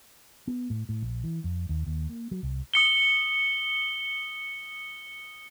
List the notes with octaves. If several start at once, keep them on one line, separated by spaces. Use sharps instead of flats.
B3
A2
A2
A#1
E3
F2
D#2
D#2
A#3
F#3
C2
D#6 C#7 G7